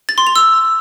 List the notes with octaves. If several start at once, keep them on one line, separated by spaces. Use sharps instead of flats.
A6
C6
F7
E6